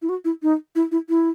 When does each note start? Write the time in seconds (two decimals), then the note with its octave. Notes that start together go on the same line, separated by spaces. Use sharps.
0.02 E4
0.09 F#4
0.25 E4
0.43 D#4
0.75 E4
0.92 E4
1.09 E4